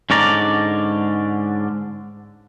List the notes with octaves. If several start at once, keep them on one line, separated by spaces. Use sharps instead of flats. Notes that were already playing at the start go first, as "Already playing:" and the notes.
G#2 D3 C#4 D4 D5 A#5